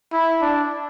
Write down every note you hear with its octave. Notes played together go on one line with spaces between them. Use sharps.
E4
D4